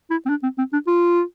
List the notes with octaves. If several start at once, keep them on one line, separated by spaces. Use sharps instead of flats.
E4
C4
D4
C4
C4
D4
F4